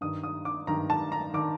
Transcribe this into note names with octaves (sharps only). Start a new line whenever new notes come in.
G2 D#3 D#6
D#6
D6
G2 D#3 A#5
A5
A#5
D#3 D6